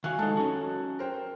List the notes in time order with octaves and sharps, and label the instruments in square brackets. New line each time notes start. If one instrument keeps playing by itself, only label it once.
[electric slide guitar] D#3 F#4 [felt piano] F5 G#5 F#6
[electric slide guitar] G#3 D#4 [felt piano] A4 A5
[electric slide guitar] C#4 F#4
[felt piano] A#4 C5 G5